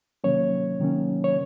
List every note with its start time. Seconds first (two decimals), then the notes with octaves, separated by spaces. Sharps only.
0.24 C3 D#3 F#3 A#3 C#4 C#5
0.80 C3 D#3 F#3 A#3 C#4
1.24 C#5